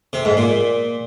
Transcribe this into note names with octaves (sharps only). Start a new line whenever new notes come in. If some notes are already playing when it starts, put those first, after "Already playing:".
C3
G#2
A#2